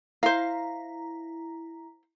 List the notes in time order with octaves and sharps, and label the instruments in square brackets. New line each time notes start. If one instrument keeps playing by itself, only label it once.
[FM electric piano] E4 A#5 [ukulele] C5 F5